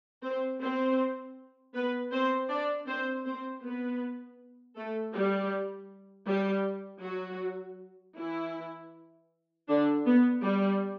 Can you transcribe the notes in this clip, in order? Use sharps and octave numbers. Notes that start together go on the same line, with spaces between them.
C4 C5
C4 C5
B3 B4
C4 C5
D4 D5
C4 C5
C4 C5
B3 B4
A3 A4
G3 G4
G3 G4
F#3 F#4
E3 E4
D3 D4
B3
G3